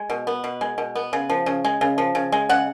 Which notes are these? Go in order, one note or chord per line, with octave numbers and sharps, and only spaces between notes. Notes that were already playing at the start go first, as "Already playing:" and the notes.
Already playing: G#3
B2
B3
B2
G#3
B2
B3
C#3
F3
C#3
G#3
C#3
F3
C#3
G#3
C#3 F#5